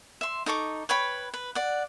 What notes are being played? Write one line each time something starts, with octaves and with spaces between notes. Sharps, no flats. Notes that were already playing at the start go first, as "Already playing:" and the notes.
E5 C6
D#4 A4 C#6 D6
B4 C#5 G5 B5
B4
D5 F#5